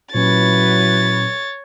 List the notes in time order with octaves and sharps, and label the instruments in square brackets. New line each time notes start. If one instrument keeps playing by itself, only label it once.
[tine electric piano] A#2 C#4 [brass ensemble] F#3 E4 B4 [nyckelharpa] C#5 [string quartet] A6